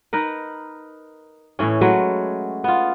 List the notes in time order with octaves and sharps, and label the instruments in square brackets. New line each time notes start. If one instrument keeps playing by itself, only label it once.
[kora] D#4 A#4 B4
A2 E3 C#4
F#3 G#3 A3 B4
B3 F4